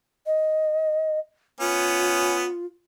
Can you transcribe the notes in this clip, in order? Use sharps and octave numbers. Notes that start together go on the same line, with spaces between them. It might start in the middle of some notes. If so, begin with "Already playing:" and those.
D#5
B3 C#4 F4